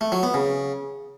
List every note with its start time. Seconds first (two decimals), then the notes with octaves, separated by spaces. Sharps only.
0.01 A3
0.12 F#3
0.23 B3
0.34 C#3